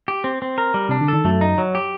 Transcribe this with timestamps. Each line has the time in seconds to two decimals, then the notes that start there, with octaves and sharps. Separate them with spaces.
0.08 G4
0.24 C4
0.42 C4
0.58 A#4
0.74 G3
0.89 C3 D4
1.01 D3
1.08 D#3 A4
1.25 F#2 F#3 A3
1.41 D#4
1.58 F#3
1.75 G4